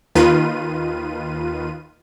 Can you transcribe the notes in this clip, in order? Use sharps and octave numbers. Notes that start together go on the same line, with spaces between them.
D#2 D#3 F4 B4 D#7